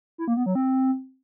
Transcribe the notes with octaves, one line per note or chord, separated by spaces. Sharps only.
E4
A#3
B3
F#3
C4